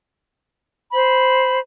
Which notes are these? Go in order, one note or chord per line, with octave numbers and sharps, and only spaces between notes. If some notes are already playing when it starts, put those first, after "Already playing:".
C5 B5